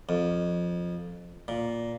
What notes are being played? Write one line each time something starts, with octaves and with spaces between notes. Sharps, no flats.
F2
A#2